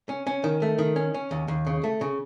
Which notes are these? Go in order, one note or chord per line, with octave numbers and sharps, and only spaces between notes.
C#4
C#4
D#3
A3
D#3
C#4
C#4
D#2
D#2
C#3
A3
C#3